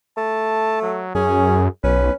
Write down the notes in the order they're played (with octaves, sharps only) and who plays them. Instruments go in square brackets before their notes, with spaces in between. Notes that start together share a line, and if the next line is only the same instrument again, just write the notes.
[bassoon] A3 [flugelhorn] A5
[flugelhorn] F#3
[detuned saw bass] F#2 [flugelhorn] C#4 [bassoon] G#4
[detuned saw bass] B1 [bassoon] C#4 [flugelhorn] B4